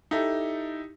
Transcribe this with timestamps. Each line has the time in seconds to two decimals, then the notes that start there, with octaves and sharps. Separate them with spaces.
0.11 D#4 E4 G4 A4